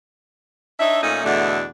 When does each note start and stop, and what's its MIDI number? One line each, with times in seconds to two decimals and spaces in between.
0.80 1.00 62
0.80 1.00 63
0.80 1.00 73
0.80 1.00 76
1.03 1.23 46
1.03 1.23 57
1.03 1.23 61
1.03 1.23 63
1.24 1.65 40
1.24 1.65 47
1.24 1.65 50
1.24 1.65 57
1.24 1.65 62